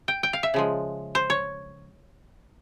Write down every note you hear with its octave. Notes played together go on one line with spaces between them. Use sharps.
G5
G5
F5
E5
C#3 F3 G#3
C5
C#5